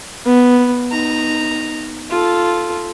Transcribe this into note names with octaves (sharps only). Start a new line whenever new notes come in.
B3
D#4 A#5
F4 A4